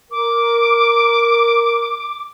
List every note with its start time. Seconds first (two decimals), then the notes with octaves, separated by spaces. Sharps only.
0.11 A#4 D6